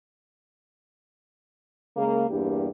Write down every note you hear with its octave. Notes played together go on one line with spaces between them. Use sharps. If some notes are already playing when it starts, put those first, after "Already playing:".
C#3 G#3 A#3
E2 G2 A#3 D4 G4